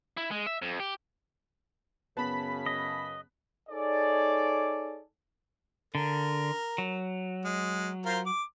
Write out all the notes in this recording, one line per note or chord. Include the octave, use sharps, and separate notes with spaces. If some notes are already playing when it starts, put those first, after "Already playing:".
E4
G#3
E5
F2
G4
F#2 C#3 B3 A5 B5 B6
D#5
D#4 G#4 A4 C#5 D5
D3 A#4
F#3
G#3
F4 A#4 C5
D6